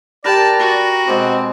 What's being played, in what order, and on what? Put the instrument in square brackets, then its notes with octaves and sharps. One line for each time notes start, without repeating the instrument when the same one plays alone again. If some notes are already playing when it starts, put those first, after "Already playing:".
[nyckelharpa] G4 A5 [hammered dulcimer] A#4 B4 [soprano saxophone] D5 [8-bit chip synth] G5 A#6
[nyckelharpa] F#4
[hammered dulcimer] B2 G#3 D6 [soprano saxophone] C4